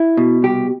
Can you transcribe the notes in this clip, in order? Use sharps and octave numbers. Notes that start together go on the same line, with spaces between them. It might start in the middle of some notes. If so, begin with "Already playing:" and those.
Already playing: E4
B2
C2 G4